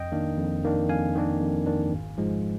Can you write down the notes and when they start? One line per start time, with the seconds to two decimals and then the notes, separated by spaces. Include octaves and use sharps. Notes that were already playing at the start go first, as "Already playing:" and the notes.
Already playing: F2 D#5 G5
0.12 D#3 A#3 D4
0.38 F2
0.64 D#3 A#3 D4
0.89 F2 F5 G#5
1.15 D#3 A#3 D4
1.41 F2
1.67 D#3 A#3 D4
1.92 G#1
2.18 G#2 F3 G#3